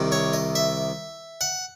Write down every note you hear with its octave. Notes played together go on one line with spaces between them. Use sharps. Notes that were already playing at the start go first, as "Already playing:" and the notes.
Already playing: C2 C3 D#3
C#5
D#5
E5
F#5